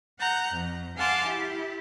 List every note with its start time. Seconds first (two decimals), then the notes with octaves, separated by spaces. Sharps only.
0.20 F#5 A#5 F#6 G6
0.51 F2
0.96 F5 F#5 G#5 A5 C6 D6
1.25 E4 G4